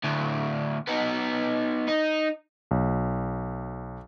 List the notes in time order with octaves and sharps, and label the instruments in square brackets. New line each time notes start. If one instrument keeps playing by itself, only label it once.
[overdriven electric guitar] D2 A2
B3 D#4
D#4
[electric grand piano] B1